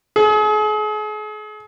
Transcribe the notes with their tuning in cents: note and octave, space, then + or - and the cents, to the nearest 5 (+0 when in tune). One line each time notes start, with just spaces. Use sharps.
G#4 +40